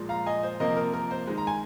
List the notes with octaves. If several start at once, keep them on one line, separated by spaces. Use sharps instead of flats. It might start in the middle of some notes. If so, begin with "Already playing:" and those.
Already playing: A#2 F3 G#3
F5 A#5
D#5 G#5
C5
C3 F3 A#3 A#4 D#5
A#4
A#4
C5
D#3 G#3
A#5
G#5